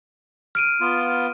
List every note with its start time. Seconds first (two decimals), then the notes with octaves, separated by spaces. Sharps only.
0.55 F6 D7 D#7
0.81 B3 F4